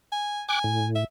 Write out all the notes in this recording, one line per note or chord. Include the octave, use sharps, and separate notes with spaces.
G#5
G5 G#5 D6 F#6
A2
E5